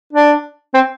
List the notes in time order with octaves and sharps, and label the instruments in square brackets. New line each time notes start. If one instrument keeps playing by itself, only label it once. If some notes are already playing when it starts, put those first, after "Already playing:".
[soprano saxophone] D4
C4